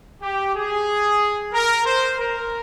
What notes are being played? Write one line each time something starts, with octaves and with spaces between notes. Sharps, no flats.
G4
G#4
A#4
C5
A#4